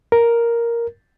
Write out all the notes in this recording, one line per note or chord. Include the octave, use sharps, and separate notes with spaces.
A#4